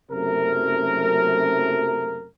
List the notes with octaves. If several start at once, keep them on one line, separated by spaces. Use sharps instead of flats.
F#1 F#2 C3 A3 A#4